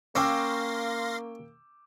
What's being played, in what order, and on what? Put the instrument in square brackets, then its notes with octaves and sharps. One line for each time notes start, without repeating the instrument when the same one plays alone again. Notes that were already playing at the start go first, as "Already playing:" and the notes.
[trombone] A#3 [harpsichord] C#4 [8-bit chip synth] F5 C6 A#6 [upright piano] G5 D6 E6